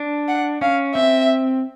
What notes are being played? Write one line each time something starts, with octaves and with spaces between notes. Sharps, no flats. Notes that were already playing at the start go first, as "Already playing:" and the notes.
Already playing: D4
F#5
C#4 F5
C4 E5